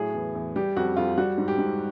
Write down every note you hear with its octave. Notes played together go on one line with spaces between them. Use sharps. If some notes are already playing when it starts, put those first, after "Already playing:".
Already playing: A2 F#3 G#4
E2
E2
G3 G4
F2 F#4
F2 F4
G3 F#4
G#2
G4
G#2